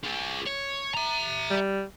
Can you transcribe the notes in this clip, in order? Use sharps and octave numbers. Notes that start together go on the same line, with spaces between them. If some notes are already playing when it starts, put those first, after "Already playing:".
F4 G#4
C#5
E5 A#5
G3